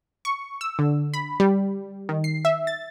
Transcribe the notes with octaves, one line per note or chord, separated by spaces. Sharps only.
C#6
E6
D3
B5
G3
D#3
C7
E5
A6